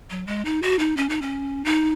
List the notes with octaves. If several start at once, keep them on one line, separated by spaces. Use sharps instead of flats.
F#3
G#3
D#4
F#4
D#4
C#4
D#4
C#4
D#4